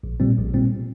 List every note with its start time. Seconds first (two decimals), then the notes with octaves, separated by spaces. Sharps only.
0.03 A#1
0.20 A#2 G3 C4
0.38 A#1
0.54 A#2 G3 C4